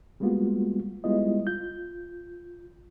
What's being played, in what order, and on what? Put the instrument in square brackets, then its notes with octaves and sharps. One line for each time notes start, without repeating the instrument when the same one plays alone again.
[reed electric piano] G3 G#3 A#3 B3 F4 F#4
G3 G#3 B3 E4 F4 D#5
F4 G6